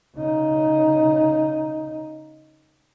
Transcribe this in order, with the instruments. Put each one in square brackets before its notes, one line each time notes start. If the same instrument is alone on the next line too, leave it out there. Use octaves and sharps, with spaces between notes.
[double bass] C#3 D#4